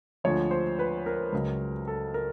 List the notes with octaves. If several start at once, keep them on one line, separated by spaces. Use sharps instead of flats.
D2 D3 F3 G#3 C#5
C5
B4
A#4
C#2 C#3 F#3
A4
A#4